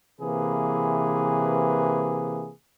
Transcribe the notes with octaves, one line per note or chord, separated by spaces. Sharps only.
C3 E3 A#3 G#4 B4